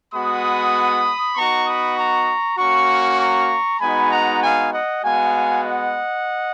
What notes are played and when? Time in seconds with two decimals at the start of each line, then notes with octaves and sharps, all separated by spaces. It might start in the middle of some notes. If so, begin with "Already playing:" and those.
0.14 G#3 B3 F#4 B5 D#6
1.36 B3 D#4 F#4 A#5 C#6
1.67 B5 D#6
1.97 A#5 C#6
2.58 A#3 C#4 F#4 A#5 C#6
3.20 A#5 C#6
3.81 G#3 B3 D#4 F#4 G#5 B5
4.11 F#5 A#5
4.43 F5 G#5
4.72 D#5 F#5
5.03 G#3 B3 F#4 F5 G#5
5.64 D#5 F#5